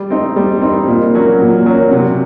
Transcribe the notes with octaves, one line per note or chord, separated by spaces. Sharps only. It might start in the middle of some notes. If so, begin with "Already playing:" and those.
Already playing: G3
C4 D#4
G3
C4 D#4
A#2
F#3 A#3 C#4
A#2
F#3 A#3 C#4
C3